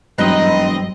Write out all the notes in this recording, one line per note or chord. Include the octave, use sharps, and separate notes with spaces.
E1 G2 F#3 G3 C4 D#4 B4 D#5